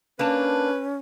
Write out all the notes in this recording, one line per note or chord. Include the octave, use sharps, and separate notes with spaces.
A#3 C#4 D4 B4 A5